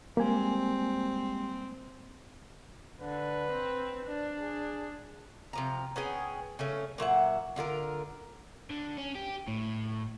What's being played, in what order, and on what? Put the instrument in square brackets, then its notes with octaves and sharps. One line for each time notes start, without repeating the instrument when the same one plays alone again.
[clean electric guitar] G3 G#3 [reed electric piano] A#3 G#5 [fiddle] C4
[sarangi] D3 [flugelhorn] B4
[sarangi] C4
D4
[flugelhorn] G#4
[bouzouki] C3 F3 A#5
B3 C#4 G#4 G5
C#3 A3 C#4
A#2 F#3 E5 F#5
D3 F4 G#4 A#4
[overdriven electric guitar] D3
C#4
G4
A2